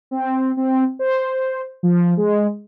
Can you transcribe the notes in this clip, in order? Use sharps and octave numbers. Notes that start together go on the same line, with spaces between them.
C4
C4
C5
F3
G#3